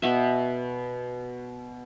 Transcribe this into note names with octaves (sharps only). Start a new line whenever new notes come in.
B2 B3 E5